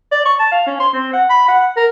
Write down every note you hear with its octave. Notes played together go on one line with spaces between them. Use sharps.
D5
C#6
A5
F5
C#4
C6
C4
F#5
B5
F#5
A#4